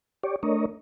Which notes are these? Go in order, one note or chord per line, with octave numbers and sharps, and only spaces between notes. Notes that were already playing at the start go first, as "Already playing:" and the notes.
G4 C#5 D5
A3 D4 A#4 C#5 D#5